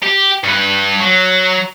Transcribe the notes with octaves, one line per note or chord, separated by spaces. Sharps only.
G4
G2 B4
F#3